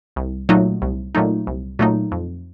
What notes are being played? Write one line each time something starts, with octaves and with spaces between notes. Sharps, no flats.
C2
A#2 F#3 A3 D#4
C2
A#2 F#3 A3 D#4
C2
A#2 F#3 A3 D#4
F2